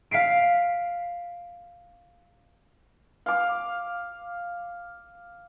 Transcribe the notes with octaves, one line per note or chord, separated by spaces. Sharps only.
F5 B6 C7 D7
F5 D6